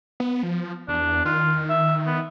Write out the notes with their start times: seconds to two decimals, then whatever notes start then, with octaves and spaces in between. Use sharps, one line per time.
0.20 B3
0.43 F3
0.88 E2 D4
1.25 D#3 F4
1.69 E5
2.06 B3